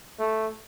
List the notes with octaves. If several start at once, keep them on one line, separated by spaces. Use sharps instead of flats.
A3